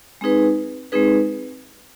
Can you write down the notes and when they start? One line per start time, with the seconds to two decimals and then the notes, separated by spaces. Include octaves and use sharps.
0.21 G#3 C4 D#4 G#4 B4
0.92 G#3 C4 D#4 G#4 B4